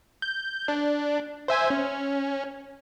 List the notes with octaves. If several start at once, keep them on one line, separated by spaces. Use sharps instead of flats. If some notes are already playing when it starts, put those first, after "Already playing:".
G6
D4
C5 E5 G#5
C#4